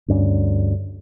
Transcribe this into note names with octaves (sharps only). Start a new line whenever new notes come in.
D2 G2 C#4 D4